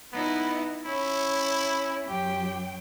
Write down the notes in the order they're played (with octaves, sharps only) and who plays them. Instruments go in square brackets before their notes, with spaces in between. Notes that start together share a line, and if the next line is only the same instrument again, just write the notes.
[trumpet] B3 [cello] D#4 E4
[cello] C#4 [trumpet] E4
[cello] F#2 G5 [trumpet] G4